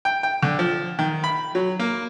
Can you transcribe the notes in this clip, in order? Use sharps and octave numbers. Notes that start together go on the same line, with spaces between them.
G5
G5
D3
F3
D#3
B5
F#3
A#3